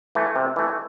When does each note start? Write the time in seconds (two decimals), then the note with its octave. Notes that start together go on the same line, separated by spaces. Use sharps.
0.15 E3 A3
0.36 C3
0.56 E3 A3